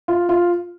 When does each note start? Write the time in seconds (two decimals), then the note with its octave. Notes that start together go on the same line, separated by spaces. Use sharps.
0.08 F4
0.29 F4